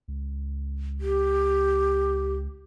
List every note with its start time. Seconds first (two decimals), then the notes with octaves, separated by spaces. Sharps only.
0.08 C#2
1.01 G4